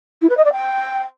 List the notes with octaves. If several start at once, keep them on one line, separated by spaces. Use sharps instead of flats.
E4
B4
D#5
D5
G5